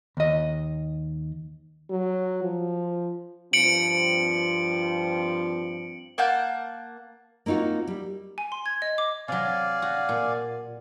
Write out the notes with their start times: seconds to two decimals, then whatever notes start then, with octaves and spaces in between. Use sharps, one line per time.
0.17 D#2 D#5
1.90 F#3
2.43 F3
3.53 G2 F3 C4 C#7 D7 F#7
6.18 A#3 F#5 A5 G6
7.46 A#3 C4 D#4 F4 F#4
7.87 G3
8.38 G#5
8.52 C6
8.66 G#6
8.82 D#5
8.98 D6
9.28 C3 F#3 D5 F5 G#5
9.82 F#4
10.09 A#2